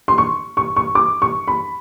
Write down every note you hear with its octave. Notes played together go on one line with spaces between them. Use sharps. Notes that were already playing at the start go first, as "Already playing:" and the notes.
C6
C#6
C#6
C#6
D6
C#6
B5